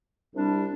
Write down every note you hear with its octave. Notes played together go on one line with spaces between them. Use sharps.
C2 C3 G3 D4